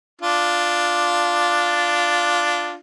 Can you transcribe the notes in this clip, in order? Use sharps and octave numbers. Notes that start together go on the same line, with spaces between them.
D4 F4